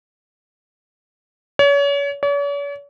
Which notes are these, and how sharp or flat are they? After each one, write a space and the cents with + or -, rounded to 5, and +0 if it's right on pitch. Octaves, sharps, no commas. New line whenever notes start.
C#5 +35
C#5 +45